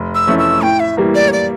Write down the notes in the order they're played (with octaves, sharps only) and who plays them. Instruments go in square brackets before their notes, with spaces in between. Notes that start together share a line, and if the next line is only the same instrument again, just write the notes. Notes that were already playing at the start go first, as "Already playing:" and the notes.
Already playing: [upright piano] F1
[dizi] E6
[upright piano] F2 E3 A3 C#4
[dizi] E6
[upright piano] A2 [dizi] G5
[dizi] E5
[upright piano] E3 G3 A#3
[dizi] D5
C#5
D5